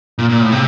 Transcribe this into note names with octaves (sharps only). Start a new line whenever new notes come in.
A#2
A#2
A2
C3